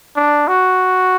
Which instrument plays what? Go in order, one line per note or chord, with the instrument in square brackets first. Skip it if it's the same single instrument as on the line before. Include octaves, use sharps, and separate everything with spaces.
[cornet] D4
F#4